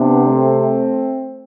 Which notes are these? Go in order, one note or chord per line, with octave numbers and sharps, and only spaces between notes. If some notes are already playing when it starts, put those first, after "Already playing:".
Already playing: C3 B3 D4
A3 C4